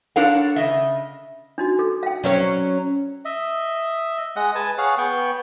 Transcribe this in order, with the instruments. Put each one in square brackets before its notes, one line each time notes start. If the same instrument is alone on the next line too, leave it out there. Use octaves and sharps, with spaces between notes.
[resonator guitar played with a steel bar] D4 A4 A#4 C#5 F5 F#5
C#3 D#5 E5
[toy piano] D4 D#4 F#4
A4
F5 G5
[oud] F#3 C#4 C#5
[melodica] D#5 E5
G#3 D#5 F#5 D#6
B4 G#5 A5
G#4 C#5 F5 F#5
B3 G5 C#6